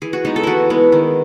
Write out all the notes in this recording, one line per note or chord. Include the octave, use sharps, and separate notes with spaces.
E3 G#4
F#4
G#3 B3 D#4
A4
E3 E4 F#4
G#3 B3
D#3